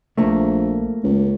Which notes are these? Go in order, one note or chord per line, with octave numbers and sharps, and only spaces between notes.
A#1 A3 A#3
C#2